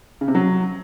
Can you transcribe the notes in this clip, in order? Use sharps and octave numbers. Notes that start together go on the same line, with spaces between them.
C#3
C3
F#3